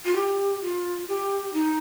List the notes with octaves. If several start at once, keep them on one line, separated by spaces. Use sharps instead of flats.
F4
G4
F4
G4
D#4